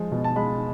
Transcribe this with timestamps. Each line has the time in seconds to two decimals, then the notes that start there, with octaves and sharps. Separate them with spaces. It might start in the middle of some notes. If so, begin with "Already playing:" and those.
Already playing: F3 G#3
0.12 B2
0.24 A5
0.36 G#3 B5